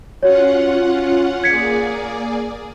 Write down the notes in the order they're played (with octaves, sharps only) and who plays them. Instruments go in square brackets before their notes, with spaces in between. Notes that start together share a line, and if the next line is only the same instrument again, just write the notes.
[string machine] C#4 F4 F#5 [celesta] F#4 C#5
[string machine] A#3 G#4 D5 [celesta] G#6 B6 C#7